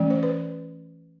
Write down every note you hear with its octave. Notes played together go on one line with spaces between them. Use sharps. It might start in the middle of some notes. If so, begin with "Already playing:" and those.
Already playing: E3 A3 C#4
C5
B4